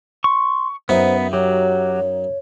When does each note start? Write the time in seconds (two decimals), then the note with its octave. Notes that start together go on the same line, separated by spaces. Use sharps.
0.24 C6 C#6
0.89 F#2 B3 D#4 C5 E5
1.33 F#3 G4 C#5